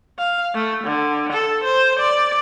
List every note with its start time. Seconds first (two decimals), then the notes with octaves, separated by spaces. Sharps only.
0.18 F5
0.54 A3
0.84 D3
1.33 A4
1.64 C5
1.99 D5